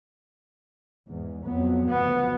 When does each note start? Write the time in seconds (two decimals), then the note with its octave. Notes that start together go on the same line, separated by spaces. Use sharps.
1.07 E2 G#2
1.46 F2 F#3 B3
1.89 F#1 D2 F3 B3